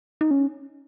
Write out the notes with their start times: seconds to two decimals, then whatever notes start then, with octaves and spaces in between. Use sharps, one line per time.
0.21 D#4
0.31 C#4